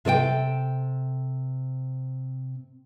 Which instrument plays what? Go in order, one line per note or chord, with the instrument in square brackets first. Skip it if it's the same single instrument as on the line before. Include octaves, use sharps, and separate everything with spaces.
[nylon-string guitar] C3 A4 D5 G5